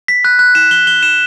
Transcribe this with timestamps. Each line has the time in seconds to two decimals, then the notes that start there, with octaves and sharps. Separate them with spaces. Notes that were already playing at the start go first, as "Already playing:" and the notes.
0.08 B6
0.25 F#6
0.39 F#6
0.55 E7
0.71 G7
0.87 G7
1.03 E7